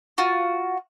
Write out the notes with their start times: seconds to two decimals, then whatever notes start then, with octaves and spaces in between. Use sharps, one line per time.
0.18 F4 F#4